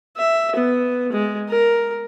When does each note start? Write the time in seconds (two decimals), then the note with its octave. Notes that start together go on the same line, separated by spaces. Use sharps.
0.17 E5
0.56 B3
1.12 G#3
1.49 A#4